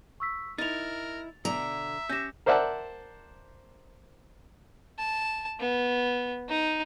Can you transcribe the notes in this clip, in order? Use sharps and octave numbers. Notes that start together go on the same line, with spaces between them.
C#6 E6 B6
D#4 E4 A#4 A6 F7
B2 D3 E5 A#5
C#4 G4 G6 A#6 E7
A#4 C5 D5 E5 F#5 A5
A5
B3
D#4